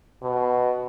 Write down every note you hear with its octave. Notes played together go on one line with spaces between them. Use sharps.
B2